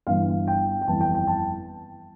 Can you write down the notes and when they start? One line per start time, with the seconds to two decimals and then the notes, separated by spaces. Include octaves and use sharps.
0.07 G1 G2 E3 F5
0.47 G5
0.81 G5
0.87 G1 F2 E3 A5
1.01 G5
1.14 G5
1.27 A5